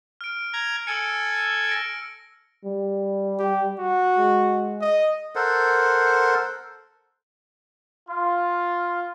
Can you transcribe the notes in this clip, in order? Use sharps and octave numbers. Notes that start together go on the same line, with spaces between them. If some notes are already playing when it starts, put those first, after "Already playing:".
F6 D7
A#5 G#6
A4 G#5 E6 C#7
A#6 D7
G3
G4
F#4
G#3
D#5
A4 A#4 C5 F#5
F4